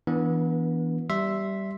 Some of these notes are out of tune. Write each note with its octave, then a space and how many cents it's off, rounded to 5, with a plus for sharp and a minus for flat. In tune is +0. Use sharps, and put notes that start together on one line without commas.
E3 -5 B3 -30 D4 -25
G3 -15 E5 +0 C6 +0